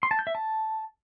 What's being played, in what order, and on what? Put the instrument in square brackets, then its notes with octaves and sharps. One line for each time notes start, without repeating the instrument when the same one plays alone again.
[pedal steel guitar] C6
A5
G6
E5
A5